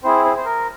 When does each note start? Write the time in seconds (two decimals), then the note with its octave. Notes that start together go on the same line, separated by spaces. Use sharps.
0.04 C4 E4 G#4 C5
0.25 C5
0.37 C5
0.45 A#4